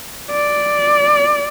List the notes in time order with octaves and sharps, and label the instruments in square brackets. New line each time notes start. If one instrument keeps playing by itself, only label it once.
[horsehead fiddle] D5